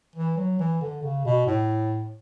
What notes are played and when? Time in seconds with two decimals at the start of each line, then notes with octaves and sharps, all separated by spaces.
0.16 E3
0.37 F#3
0.59 E3
0.82 D3
1.03 C#3
1.25 B2
1.47 A2